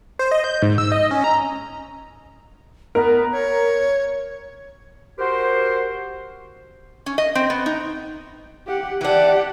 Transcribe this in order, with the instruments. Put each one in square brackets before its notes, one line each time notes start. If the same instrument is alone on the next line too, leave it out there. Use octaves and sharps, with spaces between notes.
[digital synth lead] C5
D#5
G6
G#2
E6
D#5
C#4
A#5
[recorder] B3 [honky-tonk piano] A#4
[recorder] C#5
[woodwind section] F#4 G4 A#4 C5
[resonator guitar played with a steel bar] C#4
D#5
C4
B3
D#4
[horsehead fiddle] G4 F#5
[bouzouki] E3 D4 [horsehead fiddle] G4 F#5